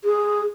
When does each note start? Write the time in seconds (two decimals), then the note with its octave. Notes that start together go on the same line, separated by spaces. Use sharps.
0.04 G#4